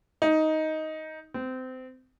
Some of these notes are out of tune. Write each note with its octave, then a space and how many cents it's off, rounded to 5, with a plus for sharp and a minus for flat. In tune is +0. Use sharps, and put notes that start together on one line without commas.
D#4 +10
C4 -25